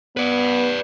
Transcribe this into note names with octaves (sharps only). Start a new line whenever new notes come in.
B3 B4 D5